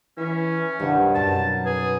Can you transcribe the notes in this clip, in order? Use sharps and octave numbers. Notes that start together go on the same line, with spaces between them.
E3 C#4 E5
C2 G2 D#3 F#5
F#2 B2 A5
G#4 B4